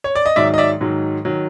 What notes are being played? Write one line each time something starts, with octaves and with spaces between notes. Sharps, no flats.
C#5
D5
D#5
G#2 D#3 F#3 D5 E5
D#5
D5 E5
G#2 D#3 F#3
D#3 F#3